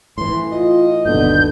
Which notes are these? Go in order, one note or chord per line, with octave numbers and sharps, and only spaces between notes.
A2 E3 C6
F4 D#5
G1 D#2 B2 D3 G6